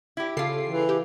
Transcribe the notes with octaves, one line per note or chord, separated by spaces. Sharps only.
E4 G4
C#3 F4 G4 A4 C7
E3
G4